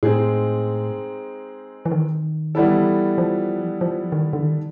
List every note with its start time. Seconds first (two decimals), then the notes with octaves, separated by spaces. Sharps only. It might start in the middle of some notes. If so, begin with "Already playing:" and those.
0.03 A2 G#3 C4 D#4 G#4
1.86 E3
1.92 D#3
2.55 E3 G3 B3 E4 A4
3.18 F3
3.81 F3
4.12 D#3
4.33 D3
4.44 D#3